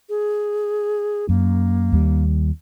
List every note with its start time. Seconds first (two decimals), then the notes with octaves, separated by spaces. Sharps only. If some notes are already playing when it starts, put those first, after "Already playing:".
0.09 G#4
1.29 F#2 A#3
1.92 D#2 G3